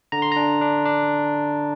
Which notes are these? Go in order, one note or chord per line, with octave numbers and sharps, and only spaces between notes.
D3 A#5
C6
D4 A#5
D4
D4